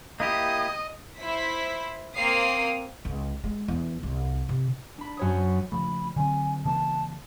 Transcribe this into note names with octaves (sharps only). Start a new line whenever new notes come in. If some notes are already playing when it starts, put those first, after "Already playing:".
A#3 E4 G4 D#5 D#6
E4 C5 B6
A#3 C4 F5 D#6 C7
C#2
G#3
E2
C2
C3
D4 B5
F#2 C#5 D#6
C#3 F3 A3 B5
D3 F#3 C4 G#5
C#3 E3 A#3 A5